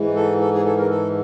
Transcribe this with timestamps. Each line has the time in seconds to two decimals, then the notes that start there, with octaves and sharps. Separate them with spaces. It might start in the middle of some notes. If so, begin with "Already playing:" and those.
Already playing: G#2 E3
0.16 A4
0.41 A4
0.53 G#4
0.66 A4
0.78 A#4
0.91 A4